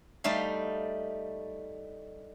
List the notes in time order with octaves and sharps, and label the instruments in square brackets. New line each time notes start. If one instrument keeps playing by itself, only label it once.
[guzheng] G3 A3 D#4 F5